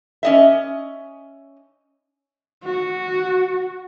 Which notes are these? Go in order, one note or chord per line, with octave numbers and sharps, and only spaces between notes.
C#4 D#5 E5
F#4